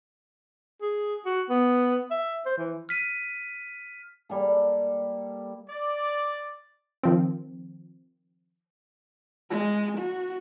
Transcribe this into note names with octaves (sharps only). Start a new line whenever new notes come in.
G#4
F#4
B3
E5
C5
E3
F6 B6 D#7
G3 A#3 A4
D5
D#3 F3 C4
G#3
F#4